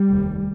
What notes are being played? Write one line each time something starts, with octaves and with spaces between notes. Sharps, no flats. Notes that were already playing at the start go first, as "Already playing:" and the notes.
Already playing: G3
F1 D#2